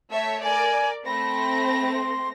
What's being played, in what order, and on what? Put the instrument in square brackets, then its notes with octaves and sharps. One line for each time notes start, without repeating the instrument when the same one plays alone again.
[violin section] A3 C#5 E5 [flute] A5
[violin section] A#4 D5 [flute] G#5
[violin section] A3 C4 A#6 [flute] B5
[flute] C6